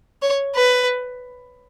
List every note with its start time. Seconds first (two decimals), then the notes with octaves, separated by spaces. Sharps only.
0.22 C#5
0.55 B4